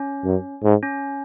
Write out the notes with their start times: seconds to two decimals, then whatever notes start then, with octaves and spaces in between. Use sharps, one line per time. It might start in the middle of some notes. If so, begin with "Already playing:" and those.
Already playing: C#4
0.25 F#2
0.63 G#2
0.83 C#4